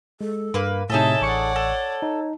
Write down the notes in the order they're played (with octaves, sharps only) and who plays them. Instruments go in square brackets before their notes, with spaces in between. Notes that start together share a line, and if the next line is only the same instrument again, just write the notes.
[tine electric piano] G#3 [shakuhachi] A4
[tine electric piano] G2 [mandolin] A#3 B4
[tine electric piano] A2 C3 [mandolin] D#4 G#4 A4 [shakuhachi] C#5 [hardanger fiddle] E5 A5
[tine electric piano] A1 C#6 C#7 [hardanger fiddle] D5 F#5
[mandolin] A4
[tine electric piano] D#4